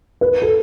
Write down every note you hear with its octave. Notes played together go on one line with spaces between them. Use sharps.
B4
A4